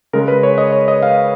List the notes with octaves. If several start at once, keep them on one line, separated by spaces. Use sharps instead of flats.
C#3 G#3 A#4
B4
C#5
D#5
C#5
D#5
F5